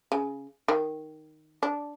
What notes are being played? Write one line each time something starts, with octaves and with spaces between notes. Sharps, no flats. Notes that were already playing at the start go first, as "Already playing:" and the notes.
C#3
D#3
D4